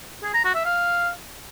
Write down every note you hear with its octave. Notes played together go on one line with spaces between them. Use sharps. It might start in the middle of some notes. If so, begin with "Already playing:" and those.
G#4
A#5
F#4
E5
F5